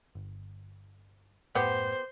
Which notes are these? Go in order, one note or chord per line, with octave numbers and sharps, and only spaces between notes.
G1
F#2 A2 A3 B3 G4 C5